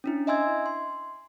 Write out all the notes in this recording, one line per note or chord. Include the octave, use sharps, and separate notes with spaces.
C#4 D4 E4
D#5 E5 G#5 C6 E6 G#6
C6